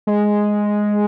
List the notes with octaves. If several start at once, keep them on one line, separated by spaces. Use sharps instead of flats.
G#3